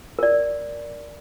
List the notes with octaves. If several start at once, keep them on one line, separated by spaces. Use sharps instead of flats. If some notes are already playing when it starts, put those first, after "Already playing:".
A#4 D5